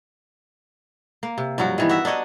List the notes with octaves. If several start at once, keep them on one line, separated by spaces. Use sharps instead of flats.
A#3
C3
G2 F3 F#3 F#4
D#3 E3 B3
F#4 E5
D4 D#4 C#5 D#5